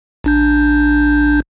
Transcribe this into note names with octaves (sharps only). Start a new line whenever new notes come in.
A1 D4 G6